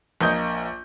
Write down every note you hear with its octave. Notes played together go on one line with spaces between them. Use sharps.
A#1 A#3 D#5 G6